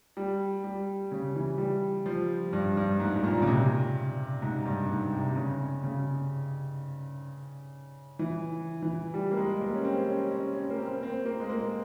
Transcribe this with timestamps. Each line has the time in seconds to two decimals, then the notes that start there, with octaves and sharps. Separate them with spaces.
0.17 G3
0.64 G3
1.12 C#3
1.36 E3
1.58 G3
2.06 F3
2.53 G2
2.77 G2
3.00 G#2
3.16 G#2
3.24 A#2
3.42 C#3
3.47 C3
4.42 G#2
4.65 G2
4.89 G#2
5.13 C3
5.36 C#3
5.83 C#3
8.19 E3
8.82 E3
9.14 G3
9.31 A#3
9.37 G#3
9.61 A#3
9.74 C#4
9.85 C4
10.09 C#4
10.31 C#4
10.55 C#4
10.70 A#3
10.78 C4
11.03 C4
11.26 A#3
11.40 G#3
11.50 A#3